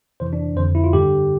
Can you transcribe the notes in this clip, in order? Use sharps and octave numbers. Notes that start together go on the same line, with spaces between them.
F2 C3 E3 C5
D4
F2 D3 C5
E4
F4
G2 D3 G4